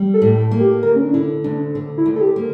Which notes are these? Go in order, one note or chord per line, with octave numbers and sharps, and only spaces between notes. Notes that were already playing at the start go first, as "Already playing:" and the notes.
Already playing: G3
A4
A2
A4
A#3
G4
D2 A#4
C#4
D4
D3 E4
D2 D4
D3
E4
D2
A4
G4
A#3